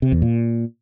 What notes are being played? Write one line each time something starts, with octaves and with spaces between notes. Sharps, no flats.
C3
E2
A#2